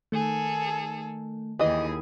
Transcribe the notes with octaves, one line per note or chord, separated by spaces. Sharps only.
D#3 A3 G#4 A4
D#2 D#3 E3 E4 G4 G#4 D#5 D#6